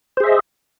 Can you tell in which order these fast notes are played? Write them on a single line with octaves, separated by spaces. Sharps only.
C5 G#4 E5 D#5